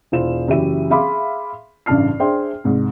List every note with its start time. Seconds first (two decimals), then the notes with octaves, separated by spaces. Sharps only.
0.12 E1 E4 F4 C5 E7
0.48 F#1 E3 F#4 G4 E5 D#7
0.90 G#4 E5 F5 B5 C6 D6
1.86 A1 G2 C#3 A5 F6 C7
2.19 D4 G#4 C5 E5 G5 C6
2.64 C2 G#2